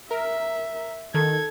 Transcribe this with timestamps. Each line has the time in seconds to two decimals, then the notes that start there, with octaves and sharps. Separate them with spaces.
0.11 A#4 E5
1.14 D#3 A4 G#6